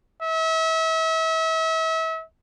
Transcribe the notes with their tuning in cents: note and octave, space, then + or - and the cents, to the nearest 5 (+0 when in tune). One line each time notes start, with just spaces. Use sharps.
E5 -35